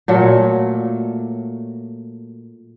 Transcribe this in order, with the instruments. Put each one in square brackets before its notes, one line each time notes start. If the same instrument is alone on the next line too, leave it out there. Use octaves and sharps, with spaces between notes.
[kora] A#2 F#3 A3